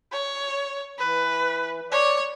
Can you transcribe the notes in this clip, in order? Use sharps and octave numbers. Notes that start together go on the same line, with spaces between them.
C#5
E3 B4
C#5 D5